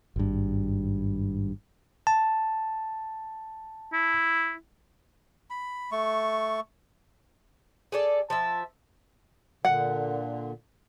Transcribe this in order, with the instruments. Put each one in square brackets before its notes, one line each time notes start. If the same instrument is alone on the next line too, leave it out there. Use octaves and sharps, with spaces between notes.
[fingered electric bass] G#1 G2
[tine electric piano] A5
[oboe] E4
[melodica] B5
A3 C#6
[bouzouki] G#4 A4 D5
[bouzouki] F3 E5 [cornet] A5
[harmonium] A#2 D3 [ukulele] F#5